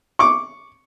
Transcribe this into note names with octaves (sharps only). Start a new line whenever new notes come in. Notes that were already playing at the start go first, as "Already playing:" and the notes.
C#6 D6